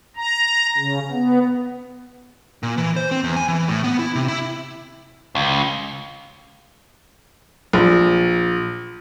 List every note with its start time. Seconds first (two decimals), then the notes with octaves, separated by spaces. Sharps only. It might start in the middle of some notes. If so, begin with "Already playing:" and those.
0.16 A#5
0.78 C#3
1.11 B3
2.63 A#2
2.77 E3
2.96 C5
3.11 C4
3.24 E2
3.36 G#5
3.48 E3
3.68 A2
3.84 B3
3.99 E4
4.15 C3
4.28 E4
5.35 C#2
7.73 A#1